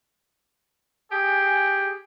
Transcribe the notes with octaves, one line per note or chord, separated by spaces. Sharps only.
G4 G#4